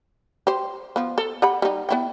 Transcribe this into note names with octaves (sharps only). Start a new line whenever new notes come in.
G4 C5
F3 B3
A4
G4 F#5 B5
G3 D#4
B3 E4 G5